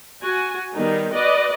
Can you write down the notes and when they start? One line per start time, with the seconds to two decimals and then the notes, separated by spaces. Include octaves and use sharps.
0.22 F#4 G#5
0.74 D#3 G3 B3 D#4
1.13 F#4 B4 D5 D#5